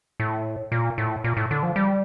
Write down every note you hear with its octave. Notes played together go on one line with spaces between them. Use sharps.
A2
A#2
A2
A#2
A2
D3
F3
G3